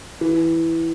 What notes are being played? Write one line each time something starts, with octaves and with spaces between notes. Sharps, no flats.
E3